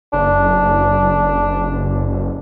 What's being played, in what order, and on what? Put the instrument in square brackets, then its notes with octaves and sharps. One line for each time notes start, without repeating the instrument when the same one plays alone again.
[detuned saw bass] F#1 [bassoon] D4